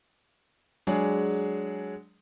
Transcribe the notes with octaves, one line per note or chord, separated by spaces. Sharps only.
F#3 G#3 D4 G#4